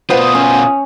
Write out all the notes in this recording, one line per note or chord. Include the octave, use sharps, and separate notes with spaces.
B2 F4 B4 C5 F#5 D#6
C#4